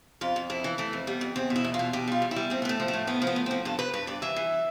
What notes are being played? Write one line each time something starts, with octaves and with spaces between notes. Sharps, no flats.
F2 F4
F2
F2 E4
E3
E3 A3
F2
G3 B3
F2
E2 C4
B2
E4
E2
F4
B2
B2 G4
G3 F4
E2
E4
G3
A2 C4
B3
A2 A3
F3
A3
A2
F3 B3
F3
B3
A2
F3 C4
G2 A4
G2 B4
G2 B4
G2 D5
E3 E5
E3